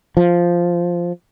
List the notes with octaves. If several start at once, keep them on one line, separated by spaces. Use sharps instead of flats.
F3